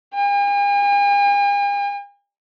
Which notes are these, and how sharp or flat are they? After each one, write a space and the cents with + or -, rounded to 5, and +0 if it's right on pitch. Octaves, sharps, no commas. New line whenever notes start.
G#5 -45